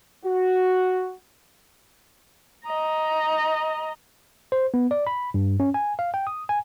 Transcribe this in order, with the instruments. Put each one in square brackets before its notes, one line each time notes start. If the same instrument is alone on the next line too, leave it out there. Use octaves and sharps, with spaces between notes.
[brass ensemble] F#4
[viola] D#5 A#5
[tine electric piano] C5
B3
D5
B5
G2
C#4
G#5
F5
G5
D#6
G#5